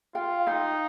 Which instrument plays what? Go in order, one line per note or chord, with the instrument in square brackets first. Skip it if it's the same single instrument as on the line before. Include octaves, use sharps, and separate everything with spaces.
[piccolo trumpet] F4 [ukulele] F5 G5
[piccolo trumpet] D#4 [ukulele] F5 G5